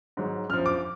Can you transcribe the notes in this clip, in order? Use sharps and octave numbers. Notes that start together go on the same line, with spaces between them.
G#2 F#3
F#2 F3 F6
D6